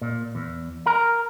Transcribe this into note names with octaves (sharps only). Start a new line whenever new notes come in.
A#2
E2
A#4